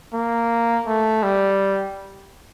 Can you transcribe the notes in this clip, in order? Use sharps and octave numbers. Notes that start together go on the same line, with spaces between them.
A#3
A3
G3